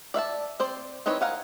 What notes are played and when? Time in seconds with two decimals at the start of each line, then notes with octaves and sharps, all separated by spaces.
0.14 D5 E5 F5 A5
0.60 C4 C5 D5
1.06 E3 C4 D#4 B4 C#5
1.21 A#4 F5 F#5 G#5